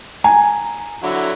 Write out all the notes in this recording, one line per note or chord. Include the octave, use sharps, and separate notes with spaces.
G#5 A#5
D3 F#3 E4